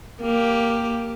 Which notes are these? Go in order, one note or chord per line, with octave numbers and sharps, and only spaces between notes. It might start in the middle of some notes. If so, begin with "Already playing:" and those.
A#3 G4